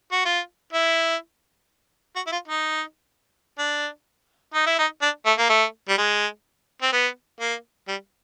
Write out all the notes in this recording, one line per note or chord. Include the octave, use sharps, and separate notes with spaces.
F#4
F4
E4
F#4
E4
F4
D#4
D4
D#4
E4
D#4
D4
A3
A#3
A3
G3
G#3
C4
B3
A#3
G3